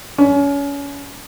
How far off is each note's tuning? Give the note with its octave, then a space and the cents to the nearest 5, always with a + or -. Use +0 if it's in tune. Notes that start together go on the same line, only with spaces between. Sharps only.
C#4 +30